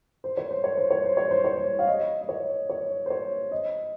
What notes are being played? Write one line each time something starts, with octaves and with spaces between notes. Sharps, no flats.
C5
C#5
C5
C#5
C5
C#5
C5
C#5
C5
C#5
C5
F5
D#5
D#5
C#5
C#5
C5
C#5
D#5